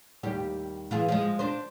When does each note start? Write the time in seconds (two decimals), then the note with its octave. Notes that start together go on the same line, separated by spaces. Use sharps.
0.23 D#2 G3 G4
0.91 E3 F4 G#4
1.09 F3 G#3
1.39 D4 C5